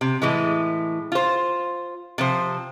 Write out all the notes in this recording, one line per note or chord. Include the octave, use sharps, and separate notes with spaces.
C3
A2 E3 G#3
F4 C5
C3 F3 C5